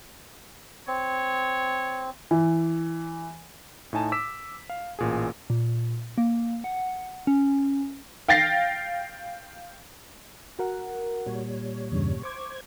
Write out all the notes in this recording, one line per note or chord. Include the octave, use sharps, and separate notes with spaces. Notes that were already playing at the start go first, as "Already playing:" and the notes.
C4 C#5
E3
A2 D#4 G#5 A5
D6 E6 B6 E7
F5
A1 A#2 G#4
A#2
A#3
F#5
C#4
F5 G5 A6 A#6 C7
F#4 A#4 F#5
A#2 G3 C#5
E2 G2 C#3
C5 C#6 D6 G#6